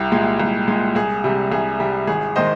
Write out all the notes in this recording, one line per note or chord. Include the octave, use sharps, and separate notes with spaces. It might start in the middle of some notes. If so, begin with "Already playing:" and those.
Already playing: C2 G4
A#2 G#3
C2
A#2 G#3
C2 G#4
C3 G3
C2 G#4
C3 G3
G#1 G#4
D#3 G#3 C5 D#5